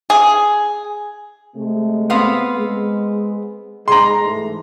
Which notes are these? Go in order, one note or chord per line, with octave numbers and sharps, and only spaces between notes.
G#4
C3 G#3 A3
B3 C4 F5
G#3
G#3 A#5 C6
G#2 E3 A3